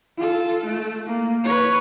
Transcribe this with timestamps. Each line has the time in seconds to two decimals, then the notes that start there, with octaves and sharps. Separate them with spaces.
0.17 F4 A4
0.66 A3
1.07 A#3
1.44 B4 C#5